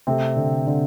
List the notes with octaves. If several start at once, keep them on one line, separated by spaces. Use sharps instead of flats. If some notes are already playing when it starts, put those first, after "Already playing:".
C3 A3 C4
D3
D3